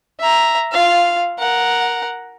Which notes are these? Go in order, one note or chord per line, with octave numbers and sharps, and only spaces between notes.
E5 A#5
F4 F5
A#4 F#5